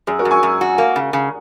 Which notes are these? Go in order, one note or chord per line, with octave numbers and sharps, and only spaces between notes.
F#2 G#4
F#4 A#4
F#2
G#5 C#6
F#2
F#4
A#3
C#3
C#3